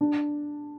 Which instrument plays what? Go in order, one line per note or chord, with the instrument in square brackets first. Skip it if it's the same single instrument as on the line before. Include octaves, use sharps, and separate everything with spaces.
[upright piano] D4